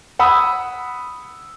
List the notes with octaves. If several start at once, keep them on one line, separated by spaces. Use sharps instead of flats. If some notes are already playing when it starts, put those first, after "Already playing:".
F#5 B5 D#6 E6